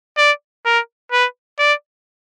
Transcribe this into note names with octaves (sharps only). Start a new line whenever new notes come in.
D5
A#4
B4
D5